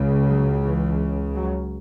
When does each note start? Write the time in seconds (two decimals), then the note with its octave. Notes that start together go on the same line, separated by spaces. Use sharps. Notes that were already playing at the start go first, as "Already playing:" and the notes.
Already playing: C#2 C#3
0.27 F#3
0.64 E3
1.35 F#3